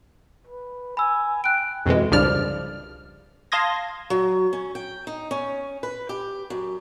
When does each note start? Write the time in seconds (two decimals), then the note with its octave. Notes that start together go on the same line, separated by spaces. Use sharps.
0.47 B4
0.97 G#5 B5 E6
1.44 G5 F#6 D7
1.86 F2 B2 E3 G#3
2.11 C2 G2 C#3 F3 D5 F6
3.52 F5 A5 C6 D#6 G#6 A#6
4.10 F#3
4.53 C#4
4.75 G5
5.07 D#4
5.31 C#4
5.83 B4
6.09 G4
6.50 F#2